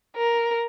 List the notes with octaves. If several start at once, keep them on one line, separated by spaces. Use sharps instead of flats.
A#4